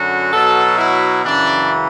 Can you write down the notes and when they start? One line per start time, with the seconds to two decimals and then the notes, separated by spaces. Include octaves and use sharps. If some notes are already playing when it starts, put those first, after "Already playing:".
Already playing: F#2 D3 F#3 F#4
0.32 B2 F#3 A4
0.78 E4
1.23 F#2 C#3 E3 D4